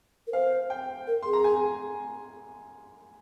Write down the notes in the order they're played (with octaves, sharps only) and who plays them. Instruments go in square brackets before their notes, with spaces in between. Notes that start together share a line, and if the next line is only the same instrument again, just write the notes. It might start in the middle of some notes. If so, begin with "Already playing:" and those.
[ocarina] A#4
[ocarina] C5 [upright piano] F5
[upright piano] G5
[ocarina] A#4
[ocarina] G#4 [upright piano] C6
[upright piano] A#5
G#5